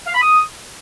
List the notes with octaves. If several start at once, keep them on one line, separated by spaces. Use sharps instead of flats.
F5
B5
D#6